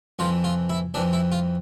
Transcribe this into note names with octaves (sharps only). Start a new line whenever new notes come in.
F2 E3 F4
F4
E4
F2 E3 D4
E4
F4